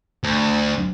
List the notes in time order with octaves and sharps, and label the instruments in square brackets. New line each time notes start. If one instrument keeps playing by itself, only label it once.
[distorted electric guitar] D2